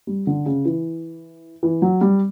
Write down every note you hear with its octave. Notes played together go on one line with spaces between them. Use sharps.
G3
D3
C#3
E3
E3
F#3
G3